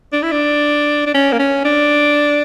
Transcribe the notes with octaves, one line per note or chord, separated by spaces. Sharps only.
D4
E4
D4
D4
C#4
A#3
C#4
D4